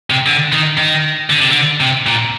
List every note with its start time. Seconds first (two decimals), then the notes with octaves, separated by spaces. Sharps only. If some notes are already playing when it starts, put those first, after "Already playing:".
0.10 C3
0.27 D3
0.52 D#3
0.78 D#3
1.30 D3
1.40 C3
1.49 D3
1.80 C3
2.07 A#2